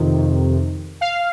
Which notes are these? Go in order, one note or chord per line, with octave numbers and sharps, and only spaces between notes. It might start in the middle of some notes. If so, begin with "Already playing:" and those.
Already playing: F2 C3 D#3
F5